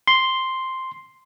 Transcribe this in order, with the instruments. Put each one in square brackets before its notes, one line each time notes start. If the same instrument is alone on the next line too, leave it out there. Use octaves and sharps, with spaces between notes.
[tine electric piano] C6